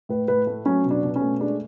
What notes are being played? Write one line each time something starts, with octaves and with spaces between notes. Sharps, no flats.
A2 B4
A2 B4
A3
F#3 C#4
B2
D4
B2
C#4
A3
G#3 D4